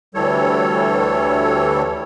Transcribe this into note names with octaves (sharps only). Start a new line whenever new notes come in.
D2 E3 G3 A4 C#5